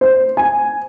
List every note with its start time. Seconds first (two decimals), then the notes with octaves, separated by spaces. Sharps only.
0.01 C5
0.37 G#5